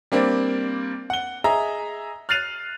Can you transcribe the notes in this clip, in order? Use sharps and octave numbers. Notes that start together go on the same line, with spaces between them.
G3 A#3 C4 D4
F#5 G7
G#4 D#5 E5 A#5
F6 F#6 A6 C7 D#7 F7